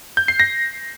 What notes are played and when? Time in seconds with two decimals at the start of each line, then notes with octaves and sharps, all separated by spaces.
0.17 G6
0.28 C7
0.40 A#6